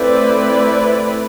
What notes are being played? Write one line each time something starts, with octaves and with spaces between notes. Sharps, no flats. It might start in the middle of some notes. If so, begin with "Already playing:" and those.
Already playing: A3 C4 E4 B4 D5